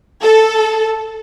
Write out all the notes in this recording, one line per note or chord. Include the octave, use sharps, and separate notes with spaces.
A4